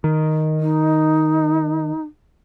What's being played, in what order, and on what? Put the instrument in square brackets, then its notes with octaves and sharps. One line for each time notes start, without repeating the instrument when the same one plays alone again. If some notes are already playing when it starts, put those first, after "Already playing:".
[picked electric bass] D#3
[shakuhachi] D#4